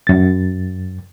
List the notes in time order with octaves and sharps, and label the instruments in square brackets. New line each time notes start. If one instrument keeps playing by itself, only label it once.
[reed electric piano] F#2 A6